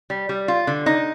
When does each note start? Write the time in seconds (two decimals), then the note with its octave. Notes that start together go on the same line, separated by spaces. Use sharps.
0.10 G3
0.29 G3
0.48 F4
0.67 D3
0.86 D#4